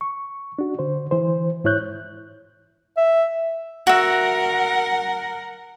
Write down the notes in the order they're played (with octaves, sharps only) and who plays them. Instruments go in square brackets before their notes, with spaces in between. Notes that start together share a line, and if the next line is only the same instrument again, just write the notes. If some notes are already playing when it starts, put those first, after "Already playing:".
[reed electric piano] C#6
D4 F#4
D3 C5
E3 C5
G#2 E4 C#5 F#6 G6
[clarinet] E5
[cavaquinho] F#4 E5 [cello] A#4 F#5